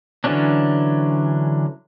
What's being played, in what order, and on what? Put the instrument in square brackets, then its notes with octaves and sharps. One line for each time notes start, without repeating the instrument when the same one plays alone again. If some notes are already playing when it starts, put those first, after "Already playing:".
[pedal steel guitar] D3 E3 F#3 C#4 D4